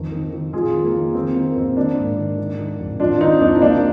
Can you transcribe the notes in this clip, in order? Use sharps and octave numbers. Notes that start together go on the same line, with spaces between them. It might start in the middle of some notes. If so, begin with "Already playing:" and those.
Already playing: F2 D#3
D#3
D#3
F2 F4 G#4
D#3
A#3
D#3
D#3 C4
D#3 A#3
F2 C4
D#3 A#3 D4
G#2
D#3
D#3
D#3
F2
F2 D4 F4
D#3 C4 D#4
F2 A#3 D4
D#4
C3 A#3 D4